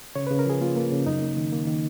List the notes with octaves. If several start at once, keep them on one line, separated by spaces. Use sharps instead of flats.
C#3 C#5
C#3 B4
A#4
F3 G#4
A#3 F4
A#3
C#3
F#2 D#4
A#3
D#3
A#3
D#3